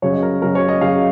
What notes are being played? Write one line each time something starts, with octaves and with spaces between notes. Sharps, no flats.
C#3 F#3 C#5
D#5
A#4
C#3 F#3 A#4
C#5
D#5
C#3 F#3 F5